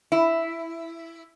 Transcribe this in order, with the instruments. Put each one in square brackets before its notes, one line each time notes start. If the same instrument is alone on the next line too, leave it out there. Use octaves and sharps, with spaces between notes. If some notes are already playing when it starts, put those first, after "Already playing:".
[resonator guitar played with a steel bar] E4